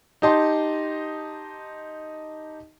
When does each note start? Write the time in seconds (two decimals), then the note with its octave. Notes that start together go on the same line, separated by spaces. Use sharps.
0.22 D#4 G4 D#5 A5 C6